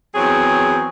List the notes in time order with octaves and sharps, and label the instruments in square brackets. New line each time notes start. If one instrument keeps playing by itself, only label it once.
[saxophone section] E2 F#3 C4 G#4